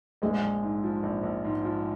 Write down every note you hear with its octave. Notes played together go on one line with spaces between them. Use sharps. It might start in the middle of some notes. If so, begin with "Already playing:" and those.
A#1 G#3
A#1
G#2
F3
A#1
A#1
G#2
F3